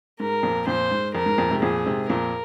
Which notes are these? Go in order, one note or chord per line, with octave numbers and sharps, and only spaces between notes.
G#2 A#4
F2 A#2
F2 A#2 C5
G#2
F2 A#4
G#2
F2 A#2
G#2 C3
F2 A#2 G#4
G#2 C3
F2 A#2 A#4